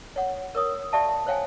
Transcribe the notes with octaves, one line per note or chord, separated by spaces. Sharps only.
C#5 F#5
A#4 C#5 D#6
G4 D5 E5 F5 A5
C5 C#5 F5 G5 G#5